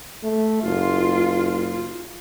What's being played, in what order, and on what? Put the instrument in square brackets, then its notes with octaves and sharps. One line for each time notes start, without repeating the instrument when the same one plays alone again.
[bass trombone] A3
[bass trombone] F#1 [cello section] F4